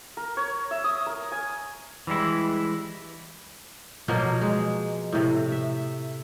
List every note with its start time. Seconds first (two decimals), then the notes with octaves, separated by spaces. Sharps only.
0.17 A#4
0.37 C#5
0.71 E5
0.84 D#6
1.06 A#4
1.32 G#5
2.07 E3 G3 G#3 E4
4.08 B2 F3 F#3 A#3
4.41 G#3
5.12 A2 C3
5.52 E5